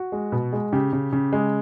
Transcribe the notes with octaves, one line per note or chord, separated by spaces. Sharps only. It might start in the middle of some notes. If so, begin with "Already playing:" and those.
Already playing: F#4
G#3
B2
G#3
C#3 G4
C#3
C#3
G#3